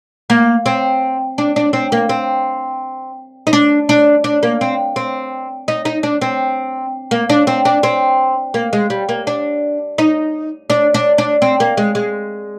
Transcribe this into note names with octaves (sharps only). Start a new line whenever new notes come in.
A#3
C4
D4
D4
C4
A#3
C4
D#4
D4
D4
D4
A#3
C4
C4
D#4
D#4
D4
C4
A#3
D4
C4
D4
C4
A#3
G#3
G3
A#3
D4
D#4
D4
D4
D4
C4
A#3
G#3
G#3